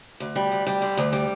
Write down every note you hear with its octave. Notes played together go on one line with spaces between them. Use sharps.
D2
G3
D2
G3
D3
D2
G3